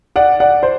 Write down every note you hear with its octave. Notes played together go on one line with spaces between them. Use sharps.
D5 F#5
D5 F#5
C5